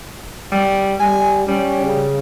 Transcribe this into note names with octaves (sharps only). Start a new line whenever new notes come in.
G3
G3 G#5
G3 C#4
C#3